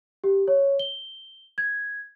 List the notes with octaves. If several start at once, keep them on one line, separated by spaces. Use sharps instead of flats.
G4
C#5
G7
G#6